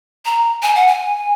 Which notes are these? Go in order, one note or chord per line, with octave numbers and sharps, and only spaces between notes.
A#5
G#5
F#5
G#5